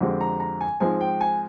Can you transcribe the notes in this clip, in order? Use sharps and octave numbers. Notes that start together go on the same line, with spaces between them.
F2 D3 G#3 C4 G4
A#5
A#5
G#5
G#2 F3 G#3 C4 G#5
G5
G#5